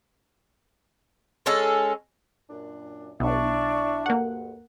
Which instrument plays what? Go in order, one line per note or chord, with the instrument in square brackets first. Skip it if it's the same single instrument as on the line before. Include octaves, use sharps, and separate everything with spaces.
[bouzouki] G#3 C#4 A4
[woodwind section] F#2 A#2 D4
[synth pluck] B1 [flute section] D4 D5 C#6 [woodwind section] E4 E5
[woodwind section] D2 G2 [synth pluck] A#3 F#5